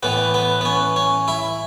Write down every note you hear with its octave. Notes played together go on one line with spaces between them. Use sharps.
A2 E3 B3
B3
B3
C#4
C#4
E4